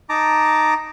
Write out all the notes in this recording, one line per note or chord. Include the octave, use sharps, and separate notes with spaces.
D#4 A5 A#5 D6